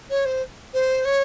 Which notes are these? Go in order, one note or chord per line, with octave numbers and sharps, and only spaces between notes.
C#5
C5
C5
C#5